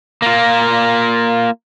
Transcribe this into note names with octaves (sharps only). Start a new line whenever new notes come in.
A#3 F4